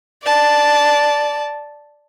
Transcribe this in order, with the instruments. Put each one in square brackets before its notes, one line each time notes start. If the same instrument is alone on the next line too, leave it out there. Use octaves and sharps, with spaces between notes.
[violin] D5 A5